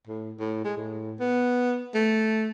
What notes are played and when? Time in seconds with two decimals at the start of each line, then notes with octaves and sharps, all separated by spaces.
0.07 A2
0.40 A2
0.65 G#3
0.77 A2
1.20 B3
1.95 A3